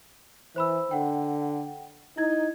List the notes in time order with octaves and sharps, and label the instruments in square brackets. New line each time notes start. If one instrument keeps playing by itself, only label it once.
[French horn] E3 [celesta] C5 B5 E6
[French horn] D3 [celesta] F#5 G5
[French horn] D#4 [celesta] E4 G#6